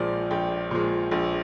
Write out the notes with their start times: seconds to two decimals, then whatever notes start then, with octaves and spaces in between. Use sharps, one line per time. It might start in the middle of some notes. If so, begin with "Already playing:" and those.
Already playing: A#1 A#2 F3 G#3 C5 D5
0.31 A#1 G5
0.71 A#2 F3 G#3
1.11 A#1